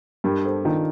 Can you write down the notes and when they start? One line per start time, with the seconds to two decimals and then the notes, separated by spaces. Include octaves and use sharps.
0.24 G2 G4 A#4
0.44 A4 C5
0.65 D#3 D4 F4